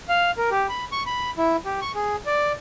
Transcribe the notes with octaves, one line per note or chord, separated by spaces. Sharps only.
F5
A#4
G4
B5
C#6
B5
E4
G4
C#6
G#4
D5